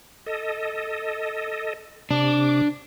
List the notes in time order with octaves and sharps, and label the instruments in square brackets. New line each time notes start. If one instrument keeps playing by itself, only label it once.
[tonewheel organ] A4 D#5
[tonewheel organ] C3 D6 [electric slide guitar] D4